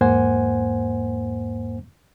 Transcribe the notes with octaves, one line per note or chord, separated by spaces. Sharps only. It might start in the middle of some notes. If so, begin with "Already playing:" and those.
E2 G#2 A#3 C5 F#5 G#5